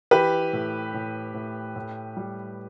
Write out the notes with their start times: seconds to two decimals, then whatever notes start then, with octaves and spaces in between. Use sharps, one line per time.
0.11 E3 G4 B4
0.53 A2
0.94 A2
1.34 A2
1.76 A2
2.17 G3